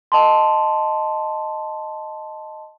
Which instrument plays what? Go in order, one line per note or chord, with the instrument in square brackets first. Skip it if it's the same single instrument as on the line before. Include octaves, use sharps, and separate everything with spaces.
[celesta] D#5 A5 C6